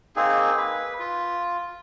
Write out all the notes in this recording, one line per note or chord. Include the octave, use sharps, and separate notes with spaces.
A#3 C4 D#4 G#4
B4
F4